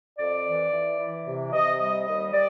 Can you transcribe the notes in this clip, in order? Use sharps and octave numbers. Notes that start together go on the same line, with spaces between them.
F2 D5
E3
E3
E3
C3
C3 D#5
G3 D#5
D#2 D#5
G3 D5